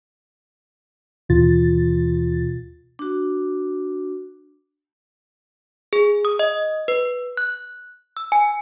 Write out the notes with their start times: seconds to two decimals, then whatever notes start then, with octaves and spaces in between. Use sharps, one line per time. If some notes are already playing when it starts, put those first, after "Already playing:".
1.29 D#2 B2 E3 F4 A6
2.99 D4 F#4
5.93 G#4
6.25 D#6
6.39 D#5
6.88 B4
7.37 F#6
8.17 E6
8.32 G#5